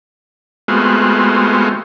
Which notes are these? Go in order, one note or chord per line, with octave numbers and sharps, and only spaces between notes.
G#3 A3 B3 C4 F4 F#4